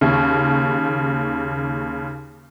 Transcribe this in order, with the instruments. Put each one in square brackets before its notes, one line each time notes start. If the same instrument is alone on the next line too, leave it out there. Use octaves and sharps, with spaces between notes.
[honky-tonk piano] D#2 C#3